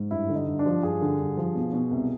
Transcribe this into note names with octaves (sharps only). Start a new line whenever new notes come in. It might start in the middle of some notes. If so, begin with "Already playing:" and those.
Already playing: G#2
G2 E4
D3
D#4
G2
D4
F3
G2 G#4
D3
G2
F3
B2
B2
C2